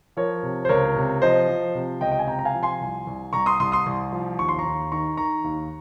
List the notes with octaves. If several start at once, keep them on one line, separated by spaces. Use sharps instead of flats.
F3 A#4 C#5
C3
C5
C#2 A#4 C#5
C3
F3 C5 D#5
F3
C3
C#2 D#5 G5
G5
G#5
C3 G5 A#5
A#5
F5 G#5
F3
G#5 C6
C2
C2
C2 A#5 C#6
C6 D#6
C2 C6 D#6
C6 D#6
C2
F3
D#2 C#6
C6
A#5 C#6
D#2
D#3 A#5 C#6
D#3 A#5 C#6
D#2